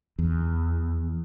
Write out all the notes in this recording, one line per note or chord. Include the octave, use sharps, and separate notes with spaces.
E2